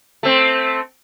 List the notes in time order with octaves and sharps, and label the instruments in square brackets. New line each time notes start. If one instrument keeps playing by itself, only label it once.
[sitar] A3 C4